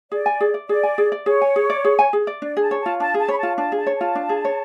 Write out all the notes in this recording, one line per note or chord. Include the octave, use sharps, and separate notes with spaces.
G#4 D5
G#5
G#4
D5
G#4 D5
G#5
G#4
D5
G#4 C#5
G#5
G#4
D5
G#4
G#5
G#4
D5
D4 D5
G#4 A5
C#5
F4 A5
D4 A5
G#4 A5
C#5 B5
F4 A5
D4 A5
G#4 A5
C#5
F4 A5
D4
G#4
C#5